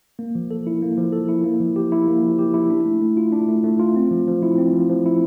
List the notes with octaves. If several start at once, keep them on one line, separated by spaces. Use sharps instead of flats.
A#3
F3
A4
E4
A#3
F3
A4
E4
A#3
F3
G4
E4
A#3
F3
G4
E4
D4
A3
A3
F4
D4
A3
A3
F4
C4
F3
F3
E4
C4
F3
F3
E4